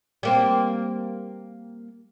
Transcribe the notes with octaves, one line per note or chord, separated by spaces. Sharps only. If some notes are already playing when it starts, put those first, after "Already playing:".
G3 A#3 C4